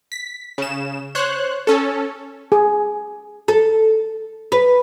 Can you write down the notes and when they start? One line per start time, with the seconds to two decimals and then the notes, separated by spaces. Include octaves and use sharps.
0.12 B6
0.58 C#3 E7
1.15 C5 C#5 F#6
1.67 C#4 A4
2.52 G#4
3.48 A4
4.52 B4